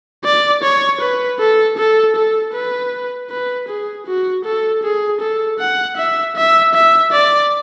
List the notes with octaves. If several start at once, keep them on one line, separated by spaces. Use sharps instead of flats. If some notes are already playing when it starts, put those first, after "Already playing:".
D5
C#5
B4
A4
A4
A4
B4
B4
G#4
F#4
A4
G#4
A4
F#5
E5
E5
E5
D5